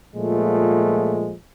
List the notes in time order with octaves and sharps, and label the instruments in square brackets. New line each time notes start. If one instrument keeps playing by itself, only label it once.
[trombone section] A#2 F3 G#3 A3